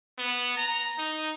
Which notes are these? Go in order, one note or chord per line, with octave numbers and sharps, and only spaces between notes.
B3
A#5
D#4